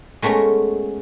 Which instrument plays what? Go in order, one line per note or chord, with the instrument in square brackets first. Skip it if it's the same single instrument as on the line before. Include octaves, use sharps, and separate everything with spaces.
[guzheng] G#3 A3 B3 C#4 A#4